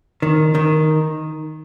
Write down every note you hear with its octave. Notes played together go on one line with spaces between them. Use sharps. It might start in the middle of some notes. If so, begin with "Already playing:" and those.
D#3
D#3